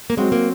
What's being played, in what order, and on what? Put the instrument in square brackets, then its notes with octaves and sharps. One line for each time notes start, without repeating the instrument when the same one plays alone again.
[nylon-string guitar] A#3
[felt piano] F#3 C4 F#4 [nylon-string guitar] G#3
[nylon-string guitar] A#3